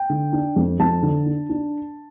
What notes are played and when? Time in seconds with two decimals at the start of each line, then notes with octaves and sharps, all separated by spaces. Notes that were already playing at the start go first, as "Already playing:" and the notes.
Already playing: G5
0.10 D3
0.33 D4
0.56 F2
0.80 F2 A5
1.03 D3
1.26 D4
1.50 D4